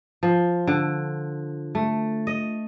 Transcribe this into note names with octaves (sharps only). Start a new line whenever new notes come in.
F3
D3
A3
D#5